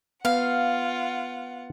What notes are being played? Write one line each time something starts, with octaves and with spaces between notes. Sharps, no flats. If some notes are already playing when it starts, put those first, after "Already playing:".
B3 F4 F5 F#5